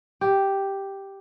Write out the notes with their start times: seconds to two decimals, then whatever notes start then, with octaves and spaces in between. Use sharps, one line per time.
0.21 G4